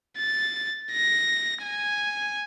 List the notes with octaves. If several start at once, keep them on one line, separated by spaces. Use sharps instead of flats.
A6
A#6
G#5